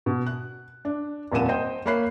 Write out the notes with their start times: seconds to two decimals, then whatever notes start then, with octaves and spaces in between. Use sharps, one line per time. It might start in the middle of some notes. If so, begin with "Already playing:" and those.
0.06 B2
0.26 F#6
0.85 D4
1.32 D#1 F2 A#2 F#5 D#7 E7
1.49 C5 D#5 G5 G6
1.86 A#3 C#5 B5 F#6 C7